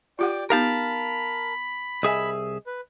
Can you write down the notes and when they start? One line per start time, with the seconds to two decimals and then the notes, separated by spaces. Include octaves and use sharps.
0.19 F4 G4 D5 F#5 G5
0.50 B3 D#4 G4 A#4 F5 A5 B5
2.03 C2 G#4 D#5 E5 G#5
2.67 B4